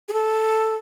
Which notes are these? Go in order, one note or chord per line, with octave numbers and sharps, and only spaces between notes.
G#4
A4